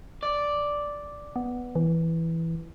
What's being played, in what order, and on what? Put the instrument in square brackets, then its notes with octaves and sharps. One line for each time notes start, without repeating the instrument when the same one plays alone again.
[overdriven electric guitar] D5
[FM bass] B3
E3